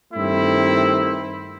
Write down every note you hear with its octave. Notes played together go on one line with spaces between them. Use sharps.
G2 D#3 A3 C4 E4